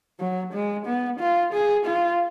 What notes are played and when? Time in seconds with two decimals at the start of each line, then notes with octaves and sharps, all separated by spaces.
0.20 F#3
0.54 G#3
0.86 B3
1.20 F4
1.54 G#4
1.86 F4